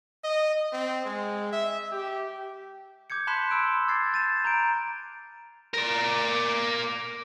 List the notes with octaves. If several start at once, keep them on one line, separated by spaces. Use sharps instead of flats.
D#5
C4
G#3
E5
G4
D6 G6 G#6 C#7
A5 B5 C6 F#6 B6 E7
B5 C6 D6 E6 D7
D6 F6 G#6 A6 C7
G6 A6 D#7 E7
A#5 G6 D7
A#4 D5